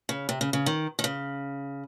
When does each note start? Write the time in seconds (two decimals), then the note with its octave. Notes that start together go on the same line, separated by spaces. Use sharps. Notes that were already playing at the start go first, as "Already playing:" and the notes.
0.09 C#3
0.29 C3
0.41 C#3
0.53 C#3
0.66 D#3
0.99 D#3
1.04 C#3